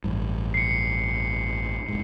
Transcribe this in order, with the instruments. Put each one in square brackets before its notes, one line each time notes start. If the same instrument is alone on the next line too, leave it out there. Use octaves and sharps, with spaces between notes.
[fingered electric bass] A1 G2
[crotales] C7 C#7
[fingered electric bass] F1 G#2